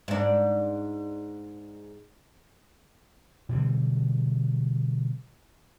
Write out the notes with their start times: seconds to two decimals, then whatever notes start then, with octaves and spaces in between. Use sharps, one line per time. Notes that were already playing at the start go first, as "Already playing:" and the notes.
0.08 G#2 D4
3.49 B2 D3 E3 G3